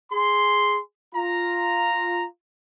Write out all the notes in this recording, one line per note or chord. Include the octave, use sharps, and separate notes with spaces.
G#4 C6
F4 A#5